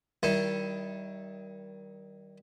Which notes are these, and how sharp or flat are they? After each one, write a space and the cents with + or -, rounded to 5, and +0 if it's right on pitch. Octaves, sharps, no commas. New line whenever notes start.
D#3 +15 G3 -25 E4 +0